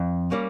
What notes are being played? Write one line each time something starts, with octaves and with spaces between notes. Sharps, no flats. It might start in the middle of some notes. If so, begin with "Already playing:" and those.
Already playing: F2
G3 A#3 C#4